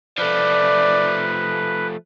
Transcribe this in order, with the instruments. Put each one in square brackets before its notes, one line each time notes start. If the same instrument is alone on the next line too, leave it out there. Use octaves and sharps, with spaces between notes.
[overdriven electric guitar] F3 A3 [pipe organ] B4 [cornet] D5